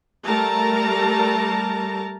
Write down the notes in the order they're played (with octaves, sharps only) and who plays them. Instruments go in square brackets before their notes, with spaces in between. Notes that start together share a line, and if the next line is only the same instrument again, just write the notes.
[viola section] G3 A3 A#4 A5 A#5